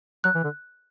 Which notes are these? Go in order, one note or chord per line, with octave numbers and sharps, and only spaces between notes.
F#3 F#6
E3
D3